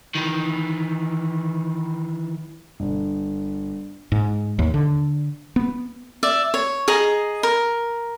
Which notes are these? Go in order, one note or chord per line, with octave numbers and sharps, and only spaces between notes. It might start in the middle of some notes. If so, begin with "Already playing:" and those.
D#3 E3
G1
G#2
D#2
D3
B3
D5 E5
C#5
G#4 D#5 A#5
A#4